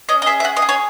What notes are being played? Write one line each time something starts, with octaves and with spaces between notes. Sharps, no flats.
C#4 D#5
D#5
G#4 E5
E5
C#4 F#5
D#5
G#4
C#5